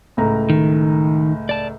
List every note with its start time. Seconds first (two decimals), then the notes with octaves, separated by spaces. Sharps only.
0.17 C#2 A2 A#5
0.50 D#3
1.49 D5 A5